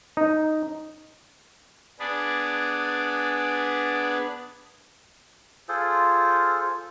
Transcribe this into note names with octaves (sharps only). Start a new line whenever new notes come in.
D#4
B3 D4 G#4 B4 D5
F4 G#4 A4 C5